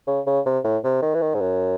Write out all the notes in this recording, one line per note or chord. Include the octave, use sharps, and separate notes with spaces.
C#3
C#3
C3
A2
C3
D#3
E3
D#3
G#2
F#2